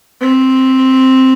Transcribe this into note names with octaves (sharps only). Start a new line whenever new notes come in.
C4